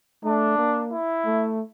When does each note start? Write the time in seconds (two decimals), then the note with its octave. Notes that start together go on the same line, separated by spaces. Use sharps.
0.24 A3 D4
0.58 A#3
0.92 E4
1.25 A3